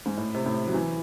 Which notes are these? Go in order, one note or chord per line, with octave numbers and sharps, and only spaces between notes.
G#2
A2
C3
A2
F#3
E3